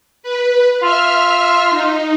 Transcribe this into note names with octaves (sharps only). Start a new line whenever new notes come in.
B4
F4 E5 F6
D#4